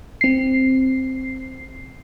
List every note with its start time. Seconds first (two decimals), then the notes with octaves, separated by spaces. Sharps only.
0.21 C4 C7